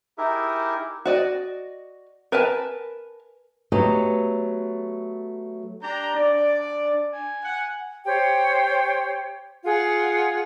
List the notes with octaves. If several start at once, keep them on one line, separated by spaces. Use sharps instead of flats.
D#4 E4 G4 G#4 A#4 E5
F#4 D5 D#5
A#4 B4 G#5 A5
F#3 A3 B3 G4 D#5
D4 G4 A#5 G6
D4 D5
G#5
F#5
G4 C5 C#5 G5
F4 G#4 F#5